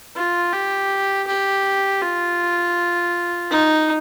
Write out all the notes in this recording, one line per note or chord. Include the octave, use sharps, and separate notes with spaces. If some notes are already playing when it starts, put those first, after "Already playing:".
F4
G4
G4
F4
D#4